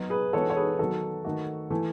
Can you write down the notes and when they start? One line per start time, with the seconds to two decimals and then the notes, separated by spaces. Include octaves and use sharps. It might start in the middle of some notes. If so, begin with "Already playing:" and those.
Already playing: F#3 B3 D#4
0.10 G#4 B4
0.33 E3 G#3 B3 F#4 A4 C#5
0.50 C#5
0.56 G#4 B4
0.79 D#3 F#3 B3 F#4 A4
1.25 D#3 A3 D#4 F#4
1.70 E3 A3 E4